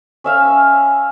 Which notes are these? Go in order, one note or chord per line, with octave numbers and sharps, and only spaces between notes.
C#4 E5 F5